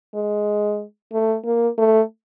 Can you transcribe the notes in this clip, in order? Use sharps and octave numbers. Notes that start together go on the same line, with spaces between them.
G#3
A3
A#3
A3